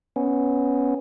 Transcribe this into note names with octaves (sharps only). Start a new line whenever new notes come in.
B3 C#4